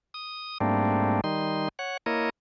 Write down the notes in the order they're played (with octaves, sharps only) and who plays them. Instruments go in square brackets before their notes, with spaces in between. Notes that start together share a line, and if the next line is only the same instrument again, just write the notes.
[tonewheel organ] D#6
G#2 G3 A3 A#3 C4 D4
D#3 G3 D#4 C6
C#5 F#5
A#3 E4 A#4 C#5 D#5